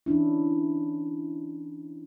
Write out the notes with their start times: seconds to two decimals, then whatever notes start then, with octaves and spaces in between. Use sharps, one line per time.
0.06 E3 C#4 D4 E4